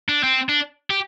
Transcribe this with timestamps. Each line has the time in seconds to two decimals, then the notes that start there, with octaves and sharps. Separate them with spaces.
0.09 D4
0.24 C4
0.49 D4
0.90 G4